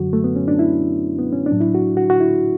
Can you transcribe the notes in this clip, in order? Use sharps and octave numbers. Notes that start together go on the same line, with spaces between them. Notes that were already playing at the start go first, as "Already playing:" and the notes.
Already playing: F#2 D3 F#3 F#4
A3
B3
C#4
D4
E4
B3
C#4
D4
A2 F#3
E4
F#4
F#4
F#4
E4